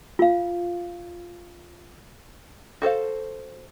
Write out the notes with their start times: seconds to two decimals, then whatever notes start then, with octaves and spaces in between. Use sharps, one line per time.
0.19 F4 F5
2.82 F#4 A4 C5 F5